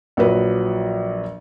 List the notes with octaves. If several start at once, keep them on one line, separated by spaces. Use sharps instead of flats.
A#1 F3 F#3 B4